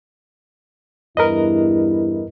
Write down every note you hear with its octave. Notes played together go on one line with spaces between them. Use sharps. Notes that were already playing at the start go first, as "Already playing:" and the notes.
E2 G2 E4 A#4 B4 D#5